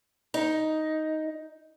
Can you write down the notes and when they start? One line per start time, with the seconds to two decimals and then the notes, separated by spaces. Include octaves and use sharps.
0.34 D#4